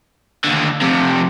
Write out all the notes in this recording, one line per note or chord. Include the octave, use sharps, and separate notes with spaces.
D#2 D3
F2 C3